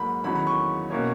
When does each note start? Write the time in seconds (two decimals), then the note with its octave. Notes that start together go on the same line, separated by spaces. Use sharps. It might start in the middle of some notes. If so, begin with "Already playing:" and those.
Already playing: G#2 F#3 A#3 B5
0.24 E2 D#3 F#3 C#4 B5
0.35 B5
0.47 C#6
0.90 B2 A#3 C#4